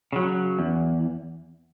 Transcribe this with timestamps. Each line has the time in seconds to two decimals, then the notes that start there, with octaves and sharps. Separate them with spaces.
0.13 C#3 F#3
0.59 E2